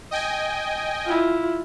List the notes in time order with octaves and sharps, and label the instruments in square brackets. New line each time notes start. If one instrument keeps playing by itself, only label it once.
[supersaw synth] D#5 G5 G#5
[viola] E4 F4